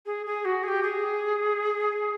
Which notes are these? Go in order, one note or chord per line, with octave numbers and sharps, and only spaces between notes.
G#4
G#4
F#4
G#4
G4
G#4